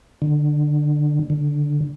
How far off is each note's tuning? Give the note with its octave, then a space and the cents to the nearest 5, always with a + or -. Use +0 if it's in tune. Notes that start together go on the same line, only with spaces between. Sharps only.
D3 +15
D3 -5